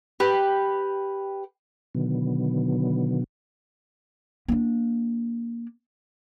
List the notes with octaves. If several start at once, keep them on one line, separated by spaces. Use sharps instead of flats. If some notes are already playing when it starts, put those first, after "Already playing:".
G4 B4
B2 D3 D#3 F#3 B3
A#3 D4